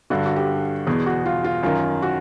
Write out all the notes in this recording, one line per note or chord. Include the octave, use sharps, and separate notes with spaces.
G2 D3 F#4
F#4
G4
E2 B2 G#4
F#4
F4
F4
F#2 D#3 F4
F#4